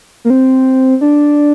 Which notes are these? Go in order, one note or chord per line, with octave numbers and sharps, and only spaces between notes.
A#3
C4
D4